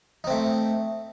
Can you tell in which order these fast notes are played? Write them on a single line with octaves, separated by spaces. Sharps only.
D#4 C4 A3